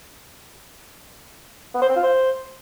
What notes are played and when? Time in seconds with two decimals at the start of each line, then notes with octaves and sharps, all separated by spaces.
1.74 B3
1.82 C5
1.89 C4
1.96 F4
2.03 C5